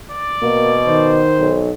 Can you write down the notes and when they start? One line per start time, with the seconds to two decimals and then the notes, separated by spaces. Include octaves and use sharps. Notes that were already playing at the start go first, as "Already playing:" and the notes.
0.11 D5
0.42 B2 A#3
0.88 D#3 C5
1.39 B1